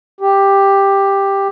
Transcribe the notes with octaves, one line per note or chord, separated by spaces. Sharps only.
G4